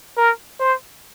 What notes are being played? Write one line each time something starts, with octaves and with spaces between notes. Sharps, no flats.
A#4
C5